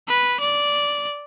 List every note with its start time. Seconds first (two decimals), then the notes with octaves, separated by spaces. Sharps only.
0.09 B4
0.40 D5